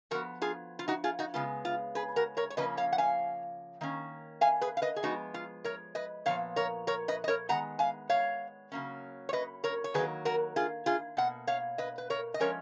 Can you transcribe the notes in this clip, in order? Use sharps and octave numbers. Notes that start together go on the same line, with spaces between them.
F3 B3 F#4 A#4
F4 G#4
F4
D#4 F#4
F4 G#4
D#4 F#4
C#3 G#3 B3 F4
F4
G#4 B4
F#4 A#4
A#4 C#5
C#5
C#3 F3 A#3 C#4 B4 D#5
C#5 F5
F#5
F5 G#5
D#3 A#3 C#4
F5 G#5
G#4 B4
F5
B4 D#5
G#4
F3 G#3 B3 D#4 F#4
F4
A#4 C#5
B4 D#5
A#2 F3 B3 C#5 F5
A#4 C#5
A#4 C#5
B4 D#5
D#5
A#4 C#5
D#3 G#3 B3 F#5 A#5
F5 G#5
C#5 F5
C#3 F#3 A#3 C#4
C#5
B4 D#5
A#4 C#5
C#5
D#3 F#3 A#3 G#4 B4
F#4 A#4
F4 G#4
F4 G#4
B2 A#3 F#5
C#5 F5
B4 D#5
B4
A#4 C#5
D#5
F3 G#3 C#4 A#4 C#5